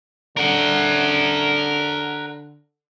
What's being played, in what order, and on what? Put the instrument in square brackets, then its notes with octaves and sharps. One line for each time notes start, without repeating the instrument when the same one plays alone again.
[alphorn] D3 [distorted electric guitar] A#4 F#5